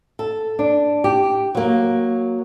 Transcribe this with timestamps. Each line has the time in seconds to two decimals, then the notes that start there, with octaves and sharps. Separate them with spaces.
0.19 A4
0.59 D4
1.04 G4
1.55 F#3 A#3